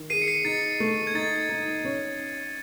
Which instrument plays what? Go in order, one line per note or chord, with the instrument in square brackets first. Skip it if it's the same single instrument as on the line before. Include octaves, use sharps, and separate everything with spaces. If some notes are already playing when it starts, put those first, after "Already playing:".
Already playing: [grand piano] D#3
[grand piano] G#4 [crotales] C7 D#7
[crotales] C#7
C7 D#7
[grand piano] D#4 [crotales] A6 C#7
[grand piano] A3
[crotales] G#6
[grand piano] D#4 [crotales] A6
[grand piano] D#4
C#4